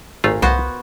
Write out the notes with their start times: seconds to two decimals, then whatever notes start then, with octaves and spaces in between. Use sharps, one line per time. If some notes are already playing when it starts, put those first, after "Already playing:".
0.24 G#1 A#2 A3 F4
0.42 C2 B3 F#4 C5